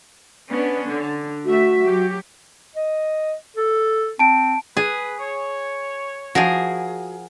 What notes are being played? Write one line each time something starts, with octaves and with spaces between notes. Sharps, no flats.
B3 C#4 D4
D3
A3 F#4 E5
F#3 G4
D#5
A4
C4 A5 D7
G#4 B4
C#5
F3 F#4 G#4 A#4